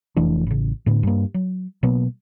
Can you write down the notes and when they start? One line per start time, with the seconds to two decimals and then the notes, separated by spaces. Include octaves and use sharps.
0.16 F1 E3 A3 D4
0.47 A1 C#3
0.86 A2 D3 B3
1.03 G2 A#3
1.34 F#3
1.83 B2 F#3 A#3 B3